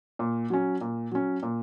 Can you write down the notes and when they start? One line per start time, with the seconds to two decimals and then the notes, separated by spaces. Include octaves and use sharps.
0.19 A#2
0.50 F#3 C#4
0.81 A#2
1.11 F#3 C#4
1.43 A#2